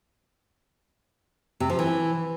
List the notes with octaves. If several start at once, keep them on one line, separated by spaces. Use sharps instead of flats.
C3
F3
E3